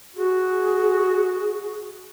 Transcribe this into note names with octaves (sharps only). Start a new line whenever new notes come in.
F#4 G#4